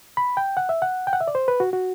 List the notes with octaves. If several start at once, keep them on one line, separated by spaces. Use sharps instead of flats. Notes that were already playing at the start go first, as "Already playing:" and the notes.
B5
G5
F#5
E5
F#5
G5
F#5
E5
D5
C5
B4
F#4
F#4